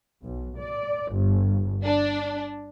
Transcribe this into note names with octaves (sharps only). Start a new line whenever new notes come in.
B1
D5
G1
D4